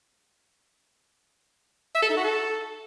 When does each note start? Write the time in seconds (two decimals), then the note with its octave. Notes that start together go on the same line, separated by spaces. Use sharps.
1.95 E5
2.02 A4
2.09 D#4
2.16 F#4
2.24 A4